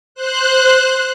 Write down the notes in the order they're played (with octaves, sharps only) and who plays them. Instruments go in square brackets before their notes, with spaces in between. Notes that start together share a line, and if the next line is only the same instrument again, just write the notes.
[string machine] C5 F#6